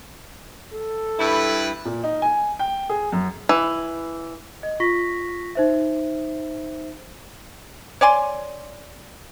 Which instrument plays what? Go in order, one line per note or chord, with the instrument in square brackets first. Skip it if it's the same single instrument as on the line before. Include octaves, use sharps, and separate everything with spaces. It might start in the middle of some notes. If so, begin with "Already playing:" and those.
[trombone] A4
[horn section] G2 E4 B4
[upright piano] A#2
D#4
G#5
G5
G#4
F#2
[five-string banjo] E3
[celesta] D#5
F4 C#6 A#6 B6
D#4 C5 E5
[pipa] C#5 D5 G#5 C6